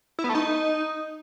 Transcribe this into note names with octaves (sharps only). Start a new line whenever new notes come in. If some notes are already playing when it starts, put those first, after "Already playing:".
E4
B3
A3
D#4